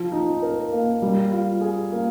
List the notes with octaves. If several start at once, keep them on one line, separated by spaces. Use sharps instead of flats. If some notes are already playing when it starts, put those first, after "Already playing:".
Already playing: F3
D#4
A#4
A#3
G3
F4
G#4
A#3